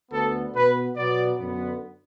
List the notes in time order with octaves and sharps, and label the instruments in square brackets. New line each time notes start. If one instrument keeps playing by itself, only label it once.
[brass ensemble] D2 D3 B3 A4
B2 B3 B4
B2 F#3 B3 D5
F#2 D3 B3